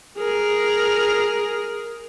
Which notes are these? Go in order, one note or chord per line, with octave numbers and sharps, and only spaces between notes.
G#4 A#4